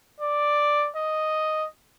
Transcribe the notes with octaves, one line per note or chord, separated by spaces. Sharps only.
D5
D#5